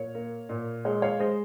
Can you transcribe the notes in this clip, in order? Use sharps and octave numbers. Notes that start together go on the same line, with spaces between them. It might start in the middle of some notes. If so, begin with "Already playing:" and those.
Already playing: A#2 C#5
A#3
A#2
G#3 C#5
C#5 F5
G#3 C5 D#5